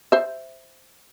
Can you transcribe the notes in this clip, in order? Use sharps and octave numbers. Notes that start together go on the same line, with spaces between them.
C5 E5